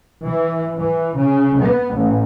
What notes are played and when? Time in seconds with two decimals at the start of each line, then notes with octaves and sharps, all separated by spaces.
0.23 E3
0.78 E3
1.18 C#3
1.60 B3
1.95 A1